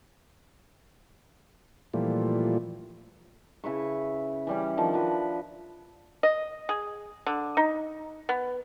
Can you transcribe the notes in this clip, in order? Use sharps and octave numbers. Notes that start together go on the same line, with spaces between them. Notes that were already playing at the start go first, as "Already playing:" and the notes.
A#2 E3 F3 G3 A3
C#3 E4 B4 C#6
E3 G3 C#4
D#3 F3 D4
F3 F#4 B4
D#5
G#4
D3
D#4
B3